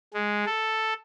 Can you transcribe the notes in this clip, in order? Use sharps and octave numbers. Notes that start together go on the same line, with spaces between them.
G#3
A4